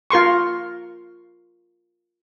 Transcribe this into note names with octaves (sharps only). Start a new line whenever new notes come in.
F4 A#4 C6 C#6